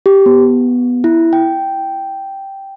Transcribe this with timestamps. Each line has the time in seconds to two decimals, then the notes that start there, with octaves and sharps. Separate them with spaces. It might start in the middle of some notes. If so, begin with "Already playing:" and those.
0.06 G4
0.26 B3
1.04 E4
1.33 G5